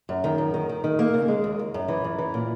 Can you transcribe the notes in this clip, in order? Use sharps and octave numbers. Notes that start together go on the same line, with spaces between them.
F#2
D#3
F#2
D#3
D#3
D#3
A#3
C#3
G#3
D#2
D#2
F#2
E3
F#2
E3
A#2